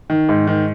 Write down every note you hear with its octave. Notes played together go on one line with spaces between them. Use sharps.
D#3
G#2
D#3